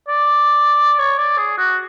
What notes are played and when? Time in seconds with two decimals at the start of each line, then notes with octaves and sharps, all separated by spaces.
0.09 D5
0.99 C#5
1.19 D5
1.38 G#4
1.58 F#4